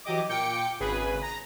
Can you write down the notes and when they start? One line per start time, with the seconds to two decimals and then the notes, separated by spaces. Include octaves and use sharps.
0.05 E3 F#3 G4 D#5 D6
0.29 A#2 G5 D6 C#7
0.80 G#1 C#3 G#4 B4
1.22 A#5